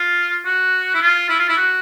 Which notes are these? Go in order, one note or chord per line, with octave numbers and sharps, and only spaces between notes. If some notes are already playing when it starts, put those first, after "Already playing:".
Already playing: F4
F#4
E4
F4
E4
F4
E4
F#4